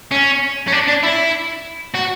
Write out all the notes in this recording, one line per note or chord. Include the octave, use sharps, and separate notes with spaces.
C#4
C#4
D4
D4
E4
F#4